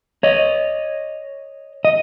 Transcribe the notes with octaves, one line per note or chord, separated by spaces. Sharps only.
C#5 D#5
D#5